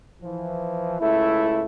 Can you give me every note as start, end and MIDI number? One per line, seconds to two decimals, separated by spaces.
0.22 0.95 52
0.22 0.95 53
0.99 1.65 37
0.99 1.65 57
0.99 1.65 64